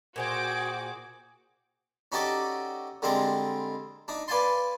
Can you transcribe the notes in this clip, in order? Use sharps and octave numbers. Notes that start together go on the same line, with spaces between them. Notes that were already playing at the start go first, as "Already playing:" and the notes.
A#2 F#4 G#4 C5 G5 D6
C#4 D#4 F#4 G4 A4 D5
D3 G3 G#3 C4 A4 A#4
D4 D#4
B4 D5 F5 G#5 A5 C6